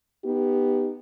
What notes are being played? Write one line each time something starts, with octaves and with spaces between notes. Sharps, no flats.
B3 D#4 G4